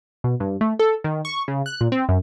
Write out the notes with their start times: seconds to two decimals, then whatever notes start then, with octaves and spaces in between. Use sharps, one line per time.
0.24 B2
0.40 G2
0.61 A3
0.79 A4
1.04 D#3
1.25 C#6
1.48 C#3
1.66 F#6
1.81 A#2
1.92 C4
2.09 F#2